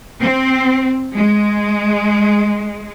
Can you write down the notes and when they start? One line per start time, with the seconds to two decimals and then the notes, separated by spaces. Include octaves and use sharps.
0.20 C4
1.16 G#3